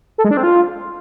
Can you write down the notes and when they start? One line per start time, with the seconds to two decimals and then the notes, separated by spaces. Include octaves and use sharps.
0.18 A4
0.25 G#3
0.31 D4
0.37 C4
0.43 F4